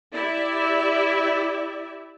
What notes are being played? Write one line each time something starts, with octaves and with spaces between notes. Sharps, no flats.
E4 G4 D5 E5